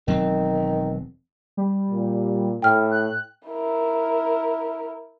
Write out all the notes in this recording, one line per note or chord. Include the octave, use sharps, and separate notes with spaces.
E1 D#3 F#3 C4
G3
A#2
A2 G5 F6
F#6
E4 A#4